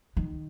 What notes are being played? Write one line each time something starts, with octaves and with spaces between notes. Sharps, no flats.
D#3